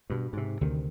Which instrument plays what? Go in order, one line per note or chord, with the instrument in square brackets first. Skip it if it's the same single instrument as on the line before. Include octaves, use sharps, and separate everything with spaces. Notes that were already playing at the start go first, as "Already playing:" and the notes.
[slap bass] G2 B2
G#2 C3
D2 C3 D#3